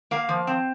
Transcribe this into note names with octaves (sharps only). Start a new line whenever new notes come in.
A#3 F5
F3
C4